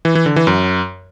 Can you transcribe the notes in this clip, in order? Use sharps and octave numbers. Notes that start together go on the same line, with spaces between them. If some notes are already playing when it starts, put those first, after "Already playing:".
E3
E3
D3
E3
F#2